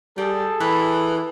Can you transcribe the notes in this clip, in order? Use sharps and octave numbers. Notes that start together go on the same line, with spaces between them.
G3 G#4 A4 G5
E3 B4